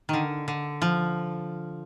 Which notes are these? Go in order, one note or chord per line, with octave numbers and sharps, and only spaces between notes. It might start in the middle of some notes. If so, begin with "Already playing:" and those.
D3 D#3
D3
F3